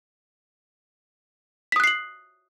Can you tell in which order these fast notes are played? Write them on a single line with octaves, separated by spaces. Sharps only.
B6 D#6 F#6 C7 F#7